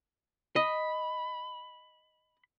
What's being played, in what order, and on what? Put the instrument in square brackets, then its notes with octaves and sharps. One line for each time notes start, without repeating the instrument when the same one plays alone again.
[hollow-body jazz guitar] D#5 [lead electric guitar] B5